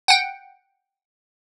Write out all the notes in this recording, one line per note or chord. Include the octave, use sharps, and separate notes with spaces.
F#5 G5